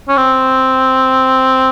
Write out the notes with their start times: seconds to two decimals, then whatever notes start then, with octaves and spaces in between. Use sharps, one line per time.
0.09 C#4
0.17 C4